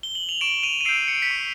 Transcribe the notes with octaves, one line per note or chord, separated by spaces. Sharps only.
G7
F#7
F7
C#6 D7 E7
D#7 F7
D#7
E6 G6 C7 D7
C#7
D7
B6 C#7
C#6